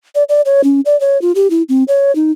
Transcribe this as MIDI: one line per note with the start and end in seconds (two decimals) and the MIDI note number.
0.15 0.23 74
0.29 0.41 74
0.45 0.61 73
0.64 0.81 61
0.85 0.99 74
1.00 1.20 73
1.22 1.32 65
1.35 1.50 67
1.50 1.62 64
1.69 1.84 60
1.88 2.14 73
2.15 2.31 63